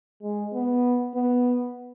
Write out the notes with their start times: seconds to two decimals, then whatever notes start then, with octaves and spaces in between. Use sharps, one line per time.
0.23 G#3
0.53 B3
1.15 B3